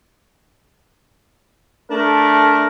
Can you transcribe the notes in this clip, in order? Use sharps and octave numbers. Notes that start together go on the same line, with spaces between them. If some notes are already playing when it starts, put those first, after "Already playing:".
A3 D4 A#4